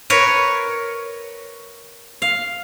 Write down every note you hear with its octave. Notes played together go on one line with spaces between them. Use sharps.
A#4 B4 C#5
F5